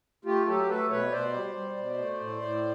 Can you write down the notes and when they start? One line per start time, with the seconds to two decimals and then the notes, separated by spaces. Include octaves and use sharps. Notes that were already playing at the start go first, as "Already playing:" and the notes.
0.25 A3 F4 G4
0.46 F#3 G4 A4
0.68 A3 A4 B4
0.90 B2 B4 C#5
1.12 B2 C5 D5
1.33 G3
1.55 G3
1.77 B2
1.98 A3
2.20 A2
2.42 A2